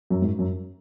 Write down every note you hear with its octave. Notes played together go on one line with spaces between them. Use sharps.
F#2
G#2
F#2